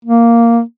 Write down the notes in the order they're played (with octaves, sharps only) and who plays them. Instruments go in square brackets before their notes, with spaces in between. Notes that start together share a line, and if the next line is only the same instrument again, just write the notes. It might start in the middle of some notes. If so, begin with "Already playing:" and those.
[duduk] A#3